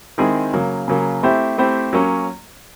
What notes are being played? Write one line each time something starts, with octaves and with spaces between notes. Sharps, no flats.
D#3 G#3 C4 E4 G#4
C#3 F#3 A#3
C#3 F#3 A#3
A3 C4 E4 G4 C5
A3 C4 E4 G4 C5
F#3 A#3 C#4